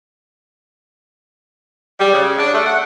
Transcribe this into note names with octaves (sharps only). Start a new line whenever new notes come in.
G3
C#3
D4
A3
F#5